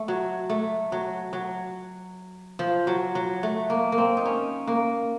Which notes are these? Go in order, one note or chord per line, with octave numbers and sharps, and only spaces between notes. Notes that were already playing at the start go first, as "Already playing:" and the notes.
Already playing: A3
F#3
A3
F#3
F#3
F3
F#3
F#3
A3
A#3
A#3
C4
D#4
C#4
A#3